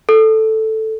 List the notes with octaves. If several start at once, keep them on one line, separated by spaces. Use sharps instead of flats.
A4